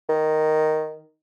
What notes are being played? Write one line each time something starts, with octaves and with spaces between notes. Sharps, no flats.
D#3